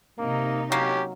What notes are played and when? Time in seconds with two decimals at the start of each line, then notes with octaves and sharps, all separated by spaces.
0.19 C3 A#3 D#4
0.72 F#3 A#3 C#4 G4